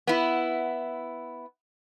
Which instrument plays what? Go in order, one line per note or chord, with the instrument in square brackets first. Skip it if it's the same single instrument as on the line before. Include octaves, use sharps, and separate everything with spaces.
[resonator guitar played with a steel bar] B3 E4